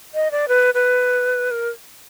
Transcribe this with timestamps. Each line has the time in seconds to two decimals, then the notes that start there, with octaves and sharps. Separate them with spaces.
0.14 D#5
0.31 D5
0.48 B4
0.74 B4
1.51 A#4